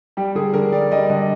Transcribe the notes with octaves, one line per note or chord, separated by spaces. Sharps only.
G3 G4
D3 G#4
D3 A#4
G3 D5
G3 D#5
D3 D#5